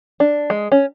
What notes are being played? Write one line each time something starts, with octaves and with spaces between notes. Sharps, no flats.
D4
G#3
C#4